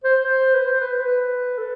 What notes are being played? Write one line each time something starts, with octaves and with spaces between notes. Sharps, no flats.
C5
C5
B4
C5
B4
B4
A4